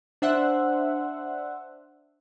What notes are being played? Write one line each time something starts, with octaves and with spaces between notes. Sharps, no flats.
D4 C5 E5 F#5